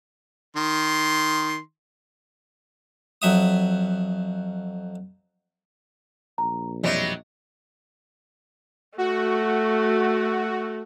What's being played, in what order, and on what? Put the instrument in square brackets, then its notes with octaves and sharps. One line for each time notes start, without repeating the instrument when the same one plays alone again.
[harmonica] D#3 C6
[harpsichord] F2 F#3 E5 D#6
[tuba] A#1 [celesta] A#5
[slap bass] F2 B2 E3 [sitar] F#3 G3 C4 [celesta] D#5 E5
[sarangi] A3 [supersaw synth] F#4